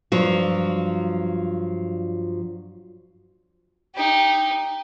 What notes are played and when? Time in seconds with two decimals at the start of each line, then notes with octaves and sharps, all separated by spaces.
0.12 G2 F3 F#3
3.95 D#4 G4